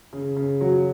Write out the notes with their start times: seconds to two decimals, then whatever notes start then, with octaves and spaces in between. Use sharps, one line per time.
0.13 C#3
0.37 C#3
0.61 F#3